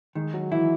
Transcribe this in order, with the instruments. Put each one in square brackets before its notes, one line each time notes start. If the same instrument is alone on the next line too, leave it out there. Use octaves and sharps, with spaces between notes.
[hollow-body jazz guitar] D#3 [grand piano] G#3
[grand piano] F#3
[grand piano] E3 [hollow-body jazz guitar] E4